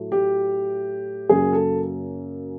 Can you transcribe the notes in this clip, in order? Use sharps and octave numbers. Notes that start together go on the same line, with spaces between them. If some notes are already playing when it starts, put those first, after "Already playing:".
Already playing: A2 F#3 A3
G4
F#2 C#3 F#3 A#3 G#4
A4